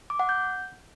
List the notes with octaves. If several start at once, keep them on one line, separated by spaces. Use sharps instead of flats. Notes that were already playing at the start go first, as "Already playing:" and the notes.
D6
F#5
G6